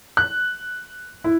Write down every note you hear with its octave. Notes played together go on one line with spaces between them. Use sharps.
F#6
E4